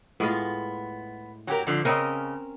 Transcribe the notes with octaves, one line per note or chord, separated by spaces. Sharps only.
A2 G#3 B3 F4
F#3 G4 A#4
F2 D3 F3
C#3 C4 C#4 A#4 D#5